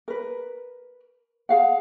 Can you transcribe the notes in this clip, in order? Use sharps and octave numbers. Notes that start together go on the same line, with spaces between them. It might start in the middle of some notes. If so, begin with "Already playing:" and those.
A#4 B4
G#4 F5 F#5